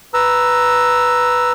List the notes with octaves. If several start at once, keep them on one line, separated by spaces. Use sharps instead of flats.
B4 A#5 E6